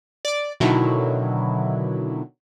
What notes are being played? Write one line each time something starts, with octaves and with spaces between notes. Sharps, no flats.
D5 D6
B2 D3 D#3 F#3 E4